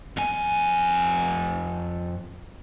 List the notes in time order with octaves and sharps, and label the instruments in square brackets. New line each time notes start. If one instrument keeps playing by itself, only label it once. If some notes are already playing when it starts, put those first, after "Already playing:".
[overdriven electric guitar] F2 G#5